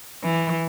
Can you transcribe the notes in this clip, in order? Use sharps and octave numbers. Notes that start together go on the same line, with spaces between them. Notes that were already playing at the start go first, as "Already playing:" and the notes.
E3